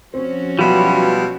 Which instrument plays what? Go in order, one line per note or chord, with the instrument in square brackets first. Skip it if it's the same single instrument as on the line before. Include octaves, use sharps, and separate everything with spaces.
[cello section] F3 C#4 F#4 [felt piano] C4
[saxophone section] B2 B3 F4 [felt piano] F#3 [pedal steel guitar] G3 E4